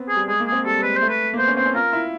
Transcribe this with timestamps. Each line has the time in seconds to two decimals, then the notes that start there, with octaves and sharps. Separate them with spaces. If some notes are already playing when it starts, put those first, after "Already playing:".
Already playing: B3 C4
0.09 G#4
0.15 G3
0.28 G#3 G#4
0.40 A#3
0.47 G#4
0.52 C4
0.64 G3 A4
0.77 G3
0.82 G#3 B4
0.96 C5
1.02 A3
1.09 B4
1.34 A#3
1.38 B3 C5
1.48 C#4
1.56 C4 C5
1.66 C#4
1.74 F4 A#4
1.93 E4